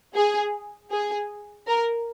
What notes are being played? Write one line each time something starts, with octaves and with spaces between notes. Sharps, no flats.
G#4
G#4
A#4